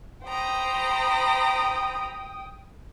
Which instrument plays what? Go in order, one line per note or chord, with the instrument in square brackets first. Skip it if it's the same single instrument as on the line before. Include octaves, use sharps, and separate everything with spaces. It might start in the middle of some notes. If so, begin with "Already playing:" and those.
[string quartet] C5 A#5 B5 [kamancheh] G5 D#6